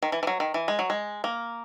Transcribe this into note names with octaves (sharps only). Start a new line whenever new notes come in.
D#3
E3
E3
F#3
D#3
E3
G#3
F#3
G#3
A#3